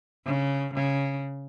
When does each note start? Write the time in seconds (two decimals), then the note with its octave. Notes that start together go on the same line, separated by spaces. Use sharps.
0.26 C#3
0.74 C#3